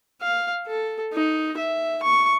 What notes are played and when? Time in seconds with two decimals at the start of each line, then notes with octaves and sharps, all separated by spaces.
0.22 F5
0.67 A4
1.13 D#4
1.57 E5
2.03 C#6